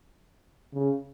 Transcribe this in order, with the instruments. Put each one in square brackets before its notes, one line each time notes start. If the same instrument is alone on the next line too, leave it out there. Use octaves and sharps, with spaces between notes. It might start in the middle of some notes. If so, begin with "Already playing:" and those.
[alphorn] C#3